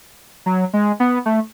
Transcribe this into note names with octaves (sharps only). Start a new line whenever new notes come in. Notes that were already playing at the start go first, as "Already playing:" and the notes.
F#3
G#3
B3
A3